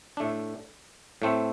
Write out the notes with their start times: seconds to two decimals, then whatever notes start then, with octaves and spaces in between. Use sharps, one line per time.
0.17 A2 A3 D4
1.22 A2 A3 C4